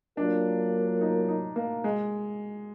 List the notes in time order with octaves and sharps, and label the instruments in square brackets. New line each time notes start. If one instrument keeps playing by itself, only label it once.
[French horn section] F#3 A#3 F4 A#4 [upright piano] D4
[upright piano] D#4
D#4
A#3
G#3